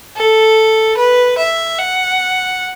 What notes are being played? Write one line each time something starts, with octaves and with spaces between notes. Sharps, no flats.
A4
B4
E5
F#5